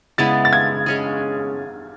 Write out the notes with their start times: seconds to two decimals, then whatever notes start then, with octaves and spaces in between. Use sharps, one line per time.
0.18 C#3 G#3 B3 E4 A6
0.45 A6
0.53 G#6
0.86 G#3 C#4 G#4